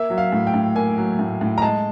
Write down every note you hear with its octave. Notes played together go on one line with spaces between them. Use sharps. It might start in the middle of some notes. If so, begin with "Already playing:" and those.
Already playing: A#3 E5
F#3
F5
A2
G5
A2
A#3 G#5
F#3
A2
A2
A#5
G#3 A5